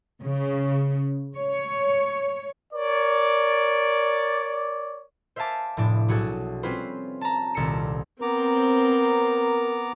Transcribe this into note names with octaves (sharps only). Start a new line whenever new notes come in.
C#3
C#5
A#4 C#5 D5
C5 E5 F5 G#5 A5 D6
F1 A2 D4 D6
B1 F#4 G#4 A4
G3 C4 C#4 F4 B4 C5
A5 A#5
D#1 C2 A4 A#6 C#7 E7
B3 C4 A#4 A#5 D6